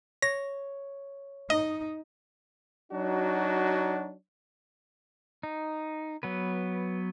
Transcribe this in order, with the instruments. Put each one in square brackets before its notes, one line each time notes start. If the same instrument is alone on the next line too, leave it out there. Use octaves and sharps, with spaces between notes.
[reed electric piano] C#5 [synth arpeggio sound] A#6
[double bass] D#4 [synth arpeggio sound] D#5
[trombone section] F#3 D4 D#4 F#4
[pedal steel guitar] D#4
F#3 B3 B4